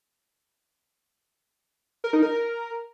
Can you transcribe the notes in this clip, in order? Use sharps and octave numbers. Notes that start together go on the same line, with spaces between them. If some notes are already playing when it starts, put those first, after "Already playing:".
A#4
D#4
A#4